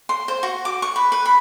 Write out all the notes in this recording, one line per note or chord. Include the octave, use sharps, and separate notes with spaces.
C6
C5
F#4
D6
C#6
B4
B4
B5